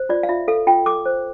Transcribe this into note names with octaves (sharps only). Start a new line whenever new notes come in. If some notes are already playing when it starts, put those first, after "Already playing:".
Already playing: C5
F4 D5
F5
F4 E5
A4 F5
F4 G5
A4 D6
C5